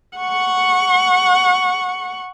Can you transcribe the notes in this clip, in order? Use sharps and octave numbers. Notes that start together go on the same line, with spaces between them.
F#5 C#6